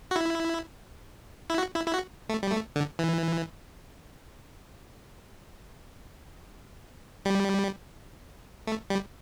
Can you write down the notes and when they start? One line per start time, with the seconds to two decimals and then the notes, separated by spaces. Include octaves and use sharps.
0.11 F#4
0.16 E4
1.50 E4
1.58 F#4
1.76 E4
1.87 E4
1.94 F#4
2.29 A3
2.43 G3
2.52 A3
2.76 D3
2.99 E3
7.25 G3
8.67 A3
8.90 G3